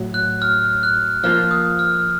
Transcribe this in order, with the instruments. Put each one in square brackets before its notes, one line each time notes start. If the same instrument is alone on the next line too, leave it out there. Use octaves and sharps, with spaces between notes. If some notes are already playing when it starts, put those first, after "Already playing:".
Already playing: [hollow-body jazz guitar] A2 F#3
[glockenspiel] F#6
F6
F#6
[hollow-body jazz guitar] F3 A#3 F4 [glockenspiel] F6
[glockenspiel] D#6
F6